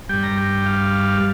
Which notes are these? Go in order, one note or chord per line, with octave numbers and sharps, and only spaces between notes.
G2 G3 G5
A#5
G5
F5